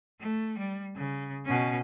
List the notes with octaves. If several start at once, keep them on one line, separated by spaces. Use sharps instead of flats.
A3
G3
C#3
B2 C#4